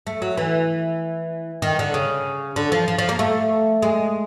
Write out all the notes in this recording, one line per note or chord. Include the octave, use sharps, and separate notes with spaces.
A3
F#3
E3
D#3
D3
C#3
D3
F3
F3
F3
A#3
A3
G#3